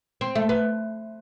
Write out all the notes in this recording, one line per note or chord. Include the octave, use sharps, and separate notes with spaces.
C4
A3
B3